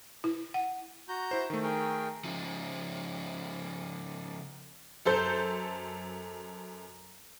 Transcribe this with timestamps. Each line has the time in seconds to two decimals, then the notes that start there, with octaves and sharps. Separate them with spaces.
0.24 E4
0.54 F#5
1.09 F#4 A#5 G6
1.31 E4 C5
1.50 D#3 A3
1.63 G#4 A#4 G5
2.24 C#3 F3
5.06 F#2 A4 C5 G6